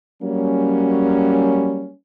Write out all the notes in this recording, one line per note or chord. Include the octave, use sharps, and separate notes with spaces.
F#3 G3 A#3 C#4